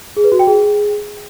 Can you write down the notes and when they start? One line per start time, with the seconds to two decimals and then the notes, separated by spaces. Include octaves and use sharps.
0.17 G#4
0.24 B4
0.32 F#4
0.39 G5
0.47 G#4